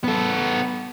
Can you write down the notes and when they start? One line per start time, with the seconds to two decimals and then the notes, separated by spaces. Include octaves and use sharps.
0.04 B3 A4